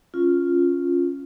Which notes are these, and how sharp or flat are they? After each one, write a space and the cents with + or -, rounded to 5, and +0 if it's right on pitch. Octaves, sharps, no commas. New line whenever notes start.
C#4 +0 F4 +0